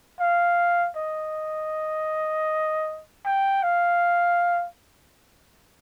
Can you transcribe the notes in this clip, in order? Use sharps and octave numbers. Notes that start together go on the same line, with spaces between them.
F5
D#5
G5
F5